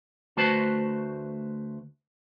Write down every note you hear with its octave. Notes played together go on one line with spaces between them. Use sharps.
D2 A3 F#4 B4 C5 A5